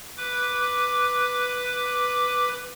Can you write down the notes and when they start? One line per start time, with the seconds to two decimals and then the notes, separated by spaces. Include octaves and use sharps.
0.18 B4 D6